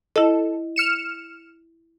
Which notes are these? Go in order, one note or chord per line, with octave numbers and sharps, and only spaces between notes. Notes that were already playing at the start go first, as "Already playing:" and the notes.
E4 A4 D#5
F6 C#7 E7